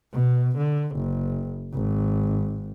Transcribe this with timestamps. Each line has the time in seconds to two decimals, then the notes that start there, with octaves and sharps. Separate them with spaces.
0.13 B2
0.58 D3
0.96 F#1
1.74 G#1